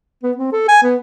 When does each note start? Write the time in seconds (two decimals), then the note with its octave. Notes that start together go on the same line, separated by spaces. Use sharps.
0.23 B3
0.38 C4
0.52 A4
0.69 G#5
0.83 B3